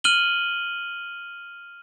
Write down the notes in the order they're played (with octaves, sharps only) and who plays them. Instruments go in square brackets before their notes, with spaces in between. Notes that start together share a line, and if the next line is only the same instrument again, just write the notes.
[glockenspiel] F6 D#7 F#7 G7